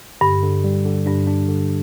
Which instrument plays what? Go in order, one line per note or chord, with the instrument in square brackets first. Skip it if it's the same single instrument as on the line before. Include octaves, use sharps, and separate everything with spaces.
[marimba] G2 [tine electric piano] D3
[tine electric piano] D3
G3
D3
[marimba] G2 [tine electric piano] D4
[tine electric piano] D4
D3